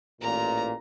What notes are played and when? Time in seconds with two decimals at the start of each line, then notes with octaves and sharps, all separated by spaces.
0.21 A1 A#2 A#5